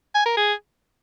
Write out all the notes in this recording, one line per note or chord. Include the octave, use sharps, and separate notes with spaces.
G#5
A#4
G#4